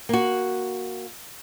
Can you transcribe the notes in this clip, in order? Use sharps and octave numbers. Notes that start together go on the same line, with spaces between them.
A#3 F#4